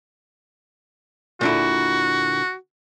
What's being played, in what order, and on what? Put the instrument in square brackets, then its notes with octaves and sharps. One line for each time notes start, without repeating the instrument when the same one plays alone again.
[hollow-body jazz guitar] A#2 D3 E4 [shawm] F#4